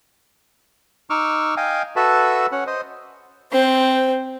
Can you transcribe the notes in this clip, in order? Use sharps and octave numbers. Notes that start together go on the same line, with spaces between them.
D#4 C#6 D6 E6 F6
D#5 F5 G5 G#5
F#4 A4 B4 E5 A5
C#4 F#5
C5 D#5
C4 C5